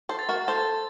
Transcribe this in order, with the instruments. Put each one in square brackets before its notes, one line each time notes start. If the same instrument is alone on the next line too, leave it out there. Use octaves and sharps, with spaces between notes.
[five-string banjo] A4 C5
[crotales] A6
[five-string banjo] F#4 A#4
[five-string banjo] A4 C5 [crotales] A6